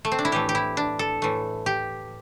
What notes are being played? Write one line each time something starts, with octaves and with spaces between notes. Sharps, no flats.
A3
C4
D4
E4
A2 E3 A3 G4
G4
E4
D4
A4
A2 E3 A3
G4